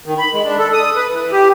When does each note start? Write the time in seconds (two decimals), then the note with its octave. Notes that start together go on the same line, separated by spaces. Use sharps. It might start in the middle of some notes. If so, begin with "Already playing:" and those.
0.06 D#3
0.18 B5
0.33 G#3
0.44 D4
0.58 A4
0.73 D#6
0.96 B4
1.11 E3
1.32 G4